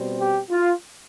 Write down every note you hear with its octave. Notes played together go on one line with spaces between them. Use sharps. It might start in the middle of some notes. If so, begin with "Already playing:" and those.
Already playing: B2 G3 C4
G4
F4